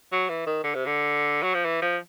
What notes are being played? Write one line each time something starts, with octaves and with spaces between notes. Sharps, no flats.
F#3
E3
D#3
D3
C3
D3
F#3
F3
E3
F3